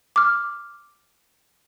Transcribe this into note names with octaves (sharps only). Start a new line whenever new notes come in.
D6 F6